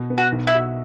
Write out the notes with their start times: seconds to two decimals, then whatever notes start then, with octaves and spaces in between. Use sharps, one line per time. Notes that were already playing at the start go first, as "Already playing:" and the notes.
Already playing: B2
0.10 B3
0.18 F#4
0.32 B1
0.47 E4
0.55 F#4